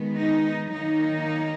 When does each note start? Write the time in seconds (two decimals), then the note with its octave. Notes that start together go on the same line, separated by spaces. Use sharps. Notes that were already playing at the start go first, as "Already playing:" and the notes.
Already playing: D#3 G#3 B3
0.17 D#4
0.73 D#3 F#3 A#3 D#4